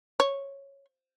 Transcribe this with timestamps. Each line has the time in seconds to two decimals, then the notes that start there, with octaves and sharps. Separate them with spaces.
0.20 C#5